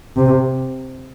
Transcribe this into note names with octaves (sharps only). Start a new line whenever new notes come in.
C3